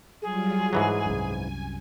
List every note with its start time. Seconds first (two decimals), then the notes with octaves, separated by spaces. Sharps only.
0.22 F#3 G3 F4 G#4
0.73 G#2 E3 F#3 G#5
1.06 C2 F#2